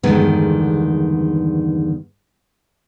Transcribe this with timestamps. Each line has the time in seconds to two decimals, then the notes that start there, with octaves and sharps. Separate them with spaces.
0.03 E2 G2 D3 D#3 G#3 B3